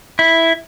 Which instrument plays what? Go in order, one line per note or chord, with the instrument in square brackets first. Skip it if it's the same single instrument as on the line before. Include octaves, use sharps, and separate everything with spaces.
[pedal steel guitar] E4